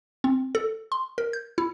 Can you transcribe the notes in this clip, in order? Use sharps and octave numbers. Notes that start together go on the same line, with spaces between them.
C4
A4
C6
A#4
G6
E4